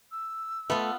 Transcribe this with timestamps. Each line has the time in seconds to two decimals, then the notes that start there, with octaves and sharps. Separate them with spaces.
0.11 E6
0.70 A3 B3 F4